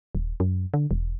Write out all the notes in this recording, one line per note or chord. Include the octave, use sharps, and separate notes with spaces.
D#1
F#2
D3
E1